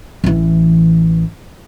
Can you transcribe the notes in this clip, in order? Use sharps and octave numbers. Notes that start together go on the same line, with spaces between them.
A1 E3